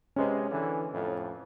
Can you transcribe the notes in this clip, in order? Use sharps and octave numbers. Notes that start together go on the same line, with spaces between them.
C3 G#3 C#4 B4
D3 E3
F2 A2